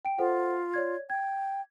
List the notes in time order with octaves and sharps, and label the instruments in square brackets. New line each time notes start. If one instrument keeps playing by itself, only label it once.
[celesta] G5 D7
[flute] F4 [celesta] A4 C5 F#5
[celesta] C#5 D5 G#6
[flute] G5 [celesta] G#6